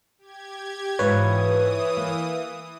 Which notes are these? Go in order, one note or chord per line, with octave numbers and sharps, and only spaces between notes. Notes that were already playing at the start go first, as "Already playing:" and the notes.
G4 G#6
G#2 E3 F4 B4 C#5 D#6
A#3